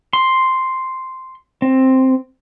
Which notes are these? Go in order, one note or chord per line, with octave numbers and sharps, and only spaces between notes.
C6
C4